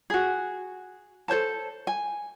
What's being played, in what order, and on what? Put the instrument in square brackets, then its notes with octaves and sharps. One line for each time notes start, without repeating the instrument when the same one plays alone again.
[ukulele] F#4 G#4
A4 C5 C#5 A5
G#5